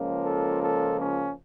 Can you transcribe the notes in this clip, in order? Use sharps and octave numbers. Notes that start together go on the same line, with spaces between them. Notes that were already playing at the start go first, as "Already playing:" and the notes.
Already playing: C#2 C#3 F3 A#3
A4
A4
C#4